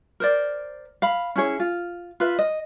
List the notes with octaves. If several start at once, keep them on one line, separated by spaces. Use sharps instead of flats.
A#4 C5 D5
F5 B5
C#4 E4 G#4 C#5
F4
F4 B4 E5
D#5